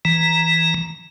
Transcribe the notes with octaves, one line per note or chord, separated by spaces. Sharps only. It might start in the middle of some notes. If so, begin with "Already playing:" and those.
E3 A#5